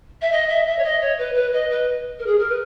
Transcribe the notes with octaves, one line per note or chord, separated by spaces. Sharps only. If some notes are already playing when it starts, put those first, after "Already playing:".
E5
D#5
E5
E5
C#5
D#5
C#5
B4
B4
D#5
B4
A#4
G#4
A#4
B4